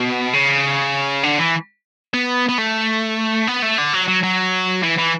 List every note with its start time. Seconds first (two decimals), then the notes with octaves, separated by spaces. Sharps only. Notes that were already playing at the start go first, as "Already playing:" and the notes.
Already playing: B2
0.33 C#3
1.23 D3
1.39 E3
2.14 B3
2.49 B3
2.58 A3
3.47 B3
3.62 A3
3.78 D3
3.93 F#3
4.08 F#3
4.23 F#3
4.83 E3
4.98 E3